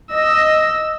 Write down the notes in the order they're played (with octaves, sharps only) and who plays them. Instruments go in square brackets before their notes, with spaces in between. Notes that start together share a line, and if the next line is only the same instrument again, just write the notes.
[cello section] D#5 [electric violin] E6